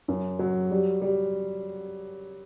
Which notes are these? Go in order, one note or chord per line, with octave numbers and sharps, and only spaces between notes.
F#2
F#3
G3
G3